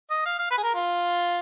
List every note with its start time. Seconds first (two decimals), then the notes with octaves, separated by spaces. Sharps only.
0.10 D#5
0.26 F5
0.39 F5
0.51 B4
0.58 G#4
0.63 A#4
0.75 F4